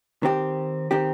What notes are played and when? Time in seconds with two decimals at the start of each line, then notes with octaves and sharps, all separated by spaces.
0.23 D#3 C4 G4
0.91 D#3 C4 G4